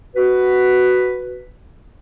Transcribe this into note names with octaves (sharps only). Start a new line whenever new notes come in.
F#4 B4